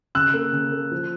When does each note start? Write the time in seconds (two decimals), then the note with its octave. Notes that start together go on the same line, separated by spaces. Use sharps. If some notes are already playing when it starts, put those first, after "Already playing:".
0.15 C#3 E6 F#6
0.34 A#3
0.53 C#3
0.72 A#3
0.91 F3